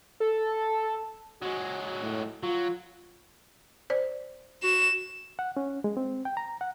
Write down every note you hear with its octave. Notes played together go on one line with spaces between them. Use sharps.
A4
F#3 G#3 F#4
A2
F#3 F4
C5 D5
F#4 E7
F#5
C#4
G#3
C4
G5
A#5
F#5